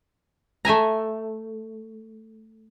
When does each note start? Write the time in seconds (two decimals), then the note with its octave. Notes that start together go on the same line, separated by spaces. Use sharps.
0.65 A3 E5 G#5 A#5